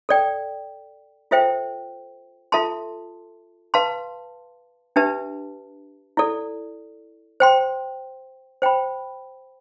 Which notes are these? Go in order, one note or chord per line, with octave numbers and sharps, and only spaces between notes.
A4 D5 G5
F4 A4 C5 E5 G5
F4 A4 E5 A5 C6
B4 F5 A5 C6
D4 G4 B4 E5 A5
E4 A4 D5
C5 G5 C6
C5 G5 B5